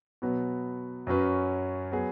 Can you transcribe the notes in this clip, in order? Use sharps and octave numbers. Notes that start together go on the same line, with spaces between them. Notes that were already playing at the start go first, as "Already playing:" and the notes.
B2 F#3 B3
F#2 F#3 C#4 F#4 B4
F#3 B3 G#4